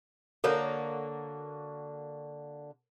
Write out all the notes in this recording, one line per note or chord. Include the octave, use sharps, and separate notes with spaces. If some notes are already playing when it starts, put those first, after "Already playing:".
D3 A#3 F#4 A4 A#4 C#5